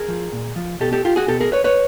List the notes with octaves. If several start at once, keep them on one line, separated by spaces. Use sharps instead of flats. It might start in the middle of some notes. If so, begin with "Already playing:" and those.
Already playing: G#4 A#4
F3
A#2
F3
B2 G4 A4
G4 A4
F4 G4
F#4 G#4
B2 G4 A4
G#4 A#4
B4 C#5
B4 C#5